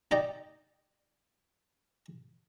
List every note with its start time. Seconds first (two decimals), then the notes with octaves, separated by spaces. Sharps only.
0.11 D#4 D5 D#5 G5 A#5